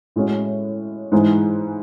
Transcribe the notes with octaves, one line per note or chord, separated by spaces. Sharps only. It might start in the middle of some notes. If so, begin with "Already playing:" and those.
A2 G#3 C#4 F#4
G#2 E3 G#3